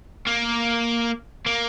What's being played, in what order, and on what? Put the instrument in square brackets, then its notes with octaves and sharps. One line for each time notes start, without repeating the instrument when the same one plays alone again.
[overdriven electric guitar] A#3
A#3